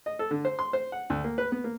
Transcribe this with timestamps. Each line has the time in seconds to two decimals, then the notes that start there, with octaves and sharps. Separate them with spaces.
0.06 D#5
0.19 A4
0.31 D3
0.45 C5
0.59 C6
0.73 C5
0.92 F#5
1.10 D2
1.24 A#3
1.38 B4
1.52 B3
1.64 A#3